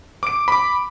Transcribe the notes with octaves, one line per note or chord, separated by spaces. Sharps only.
D6 D7
B5 D6